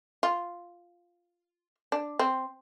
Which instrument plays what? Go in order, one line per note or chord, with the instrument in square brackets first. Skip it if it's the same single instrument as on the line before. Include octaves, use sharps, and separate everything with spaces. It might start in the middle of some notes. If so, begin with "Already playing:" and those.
[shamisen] F4
D4
C4